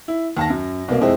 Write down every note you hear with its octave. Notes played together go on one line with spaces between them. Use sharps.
E4
D#2 A5 A#6
F#2
C2 B2 A#3
F2 G#3 C4 E4